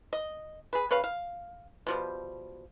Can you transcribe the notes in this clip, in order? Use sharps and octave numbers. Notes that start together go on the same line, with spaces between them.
D#5
G#4 B4
C#3 B4 C#5 F5
F5
B2 F3 G3